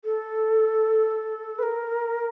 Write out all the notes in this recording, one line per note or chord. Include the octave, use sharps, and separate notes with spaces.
A4
B4
A#4